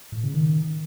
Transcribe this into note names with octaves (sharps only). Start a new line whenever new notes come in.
A2
C#3
D#3